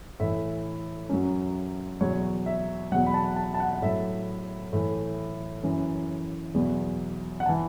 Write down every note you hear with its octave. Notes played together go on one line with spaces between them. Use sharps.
A2 E3 E5
F#2 F#3
E2 B2 F#3 C#5
E5
E2 B2 F#3 F#5
B5
A5
A5
A5
F#5
F#5
A2 F#3 E5
A2 E3
F#2 E3
E2 B2 F#3
F#5
E3 A5